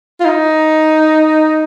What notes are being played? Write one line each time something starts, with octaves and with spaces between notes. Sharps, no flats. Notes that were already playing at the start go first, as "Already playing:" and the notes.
F4
D#4